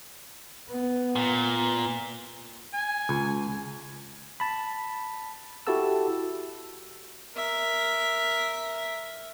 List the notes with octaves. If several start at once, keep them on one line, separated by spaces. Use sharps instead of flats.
B3
A#2
G#5
C#2
A5 B5
E4 F#4 G4 A4 A5 E6
A#4 E5